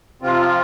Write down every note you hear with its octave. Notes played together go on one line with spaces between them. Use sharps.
C3 F3 C4 F4